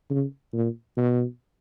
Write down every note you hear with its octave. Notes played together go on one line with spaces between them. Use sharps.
C#3
A#2
B2